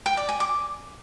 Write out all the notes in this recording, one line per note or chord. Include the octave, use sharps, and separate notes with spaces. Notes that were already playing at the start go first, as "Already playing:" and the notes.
G5
D5
G#5
D6